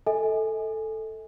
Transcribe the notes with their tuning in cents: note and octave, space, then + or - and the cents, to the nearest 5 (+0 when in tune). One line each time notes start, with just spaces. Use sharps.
A4 +0 D#5 +45 G#5 +0